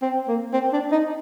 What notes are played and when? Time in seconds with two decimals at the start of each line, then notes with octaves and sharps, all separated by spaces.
0.02 C4
0.28 A#3
0.54 C4
0.73 D4
0.92 D#4